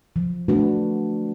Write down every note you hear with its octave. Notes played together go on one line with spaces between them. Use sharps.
F3
A3 D4 F#4 B4